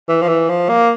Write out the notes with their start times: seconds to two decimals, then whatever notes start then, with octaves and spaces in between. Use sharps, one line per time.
0.08 E3
0.22 F3
0.29 E3
0.49 F3
0.69 A#3